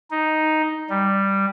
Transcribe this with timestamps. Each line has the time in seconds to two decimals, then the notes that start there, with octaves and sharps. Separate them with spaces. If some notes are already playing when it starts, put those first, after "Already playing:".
0.11 D#4
0.90 G3